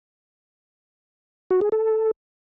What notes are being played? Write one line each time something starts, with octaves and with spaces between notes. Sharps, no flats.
F#4
G#4
A4